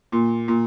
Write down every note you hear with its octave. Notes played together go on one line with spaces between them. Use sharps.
A#2
A#2